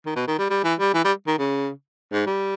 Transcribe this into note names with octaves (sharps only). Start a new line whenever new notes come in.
D#3
B2
D#3
G3
G3
E3
G3
E3
G3
D#3
C#3
G#2
G3